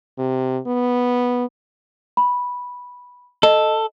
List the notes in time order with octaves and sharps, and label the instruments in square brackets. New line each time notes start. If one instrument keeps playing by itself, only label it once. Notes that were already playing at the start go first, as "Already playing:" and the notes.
[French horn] C3
B3
[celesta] B5
[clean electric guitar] A4 [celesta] D#5